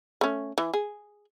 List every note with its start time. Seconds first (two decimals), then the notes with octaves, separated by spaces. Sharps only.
0.21 A3 C#4
0.58 E3
0.73 G#4